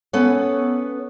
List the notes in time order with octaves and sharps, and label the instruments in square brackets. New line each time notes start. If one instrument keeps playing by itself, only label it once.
[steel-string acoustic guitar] B3 C#4 A4 B4 C#5